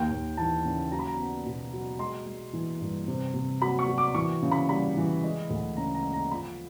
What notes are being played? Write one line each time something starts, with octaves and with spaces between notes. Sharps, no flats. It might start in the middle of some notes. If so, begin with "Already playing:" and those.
Already playing: D#2 G5
D#2
E3 A5
C#3
F#3 A#5
B5
A#5
B3
B2
F#3
G#3 C6
G#3
E3
G2
C3
C3
F#3 B5
C#6
F#3
D6
E3 C#6
C#3
B5
G3 B5
E3
G#3
D2
C#3 A#5
A#5
G#3
A#5
F3 B5